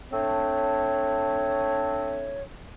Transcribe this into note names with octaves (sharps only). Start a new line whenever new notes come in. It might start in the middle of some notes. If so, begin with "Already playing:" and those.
A3 C4 D4 C#5